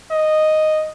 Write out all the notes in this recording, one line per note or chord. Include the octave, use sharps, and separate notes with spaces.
D#5